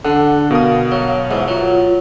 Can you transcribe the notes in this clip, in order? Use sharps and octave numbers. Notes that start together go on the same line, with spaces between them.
D3 D4 A4 F#5
B2 A#4 F5 D#6
F#3
G#2 E3 F#5
F#3 F4